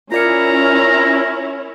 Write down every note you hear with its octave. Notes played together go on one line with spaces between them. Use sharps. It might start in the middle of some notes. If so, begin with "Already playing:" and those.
C#4 E4 F4 A#4 C#5 D5 A#5 C#7